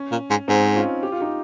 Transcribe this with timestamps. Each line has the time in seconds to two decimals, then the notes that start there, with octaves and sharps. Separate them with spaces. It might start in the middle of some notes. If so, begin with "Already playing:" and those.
Already playing: C#4
0.12 A#2
0.30 G#2
0.48 G#2 C4 D#4
0.75 C#4 F4
1.03 G4
1.12 F4
1.21 D#4 G4